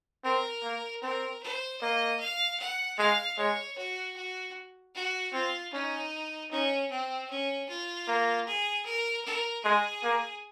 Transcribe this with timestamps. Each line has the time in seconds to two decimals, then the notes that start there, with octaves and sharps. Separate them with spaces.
0.24 C4 A#4
0.63 A#3
1.02 C4 A#4
1.42 C5
1.81 A#3 D#5
2.20 F5
2.59 F#5
2.98 G#3 F5
3.37 G#3 C#5
3.77 F#4
4.16 F#4
4.95 F#4
5.33 C4 F4
5.72 C#4 D#4
6.51 C#4 D#4
6.91 C4
7.30 C#4
7.69 F4
8.08 A#3
8.47 G#4
8.86 A#4
9.25 A#4
9.64 G#3 G#4
10.04 A#3